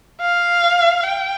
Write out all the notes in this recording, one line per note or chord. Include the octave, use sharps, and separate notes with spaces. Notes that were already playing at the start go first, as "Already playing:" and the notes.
F5
G5